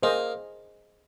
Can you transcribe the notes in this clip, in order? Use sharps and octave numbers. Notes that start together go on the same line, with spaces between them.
A#3 G#4 C5 D#5